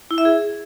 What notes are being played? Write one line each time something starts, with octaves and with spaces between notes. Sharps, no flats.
E4
E5
G#4